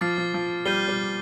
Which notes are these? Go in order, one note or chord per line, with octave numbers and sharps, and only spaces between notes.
F3 D6 F6 A6 C7
F3
F3
G3 G6 C7 D#7 G7
G3